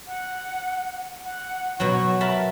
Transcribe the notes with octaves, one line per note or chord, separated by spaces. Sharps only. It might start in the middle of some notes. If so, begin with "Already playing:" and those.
F#5
F#5
B2 F#3 C#6
A#4 E5 A5 B5